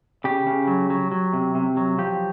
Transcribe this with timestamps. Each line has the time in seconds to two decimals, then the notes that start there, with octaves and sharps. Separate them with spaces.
0.24 C#3 G4
0.47 C#3
0.67 F#3
0.90 F#3
1.12 F#3
1.33 C3
1.55 C3
1.77 F#3
1.98 F3 G4